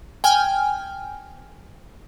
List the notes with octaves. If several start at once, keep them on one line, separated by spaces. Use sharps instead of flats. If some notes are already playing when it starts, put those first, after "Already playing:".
G5 G#5 F6